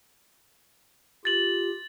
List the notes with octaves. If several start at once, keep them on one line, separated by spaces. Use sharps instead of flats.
F4 G4 A6 F#7